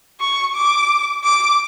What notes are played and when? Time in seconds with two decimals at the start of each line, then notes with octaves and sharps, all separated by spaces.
0.20 C#6
0.54 D6
1.23 D6